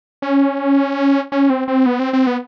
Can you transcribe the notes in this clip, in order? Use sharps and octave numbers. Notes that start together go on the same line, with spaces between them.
C#4
C#4
C4
C4
B3
C4
C4
B3